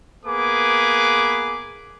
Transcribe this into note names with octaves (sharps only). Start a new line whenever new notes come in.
A#3 B3 G#4 B4 D6